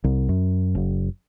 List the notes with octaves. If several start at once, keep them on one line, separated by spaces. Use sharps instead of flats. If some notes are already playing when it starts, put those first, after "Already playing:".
C2
F#2
F#1